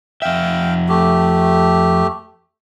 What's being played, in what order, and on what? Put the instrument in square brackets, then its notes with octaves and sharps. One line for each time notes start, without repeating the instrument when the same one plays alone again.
[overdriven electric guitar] F2 E5 [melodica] F5 G5
[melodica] A3 G4